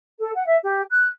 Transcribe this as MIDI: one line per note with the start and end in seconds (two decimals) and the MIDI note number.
0.19 0.31 69
0.34 0.45 78
0.46 0.56 76
0.63 0.81 67
0.90 1.06 90